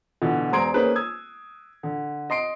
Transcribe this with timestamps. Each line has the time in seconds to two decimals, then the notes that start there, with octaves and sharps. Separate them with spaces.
0.22 B2 D3 E3
0.52 E1 C5 A#5 C6 G#6 D7
0.74 A#3 C#4 D#4 G#4 B4 C5
0.95 D#6 E6 G#6
1.83 D3
2.30 D#5 C6 C7 D7